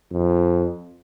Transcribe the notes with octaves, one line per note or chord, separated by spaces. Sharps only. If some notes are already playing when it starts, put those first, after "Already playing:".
F2